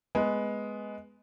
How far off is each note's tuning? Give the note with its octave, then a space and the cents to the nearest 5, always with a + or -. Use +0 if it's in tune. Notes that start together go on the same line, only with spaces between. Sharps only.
G#3 +5 B3 +0